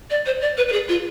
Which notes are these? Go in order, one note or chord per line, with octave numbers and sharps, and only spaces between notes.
D5
C5
D5
B4
B4
G#4
F4